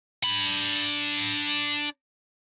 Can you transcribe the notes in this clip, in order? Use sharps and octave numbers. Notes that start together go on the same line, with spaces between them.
D4 B5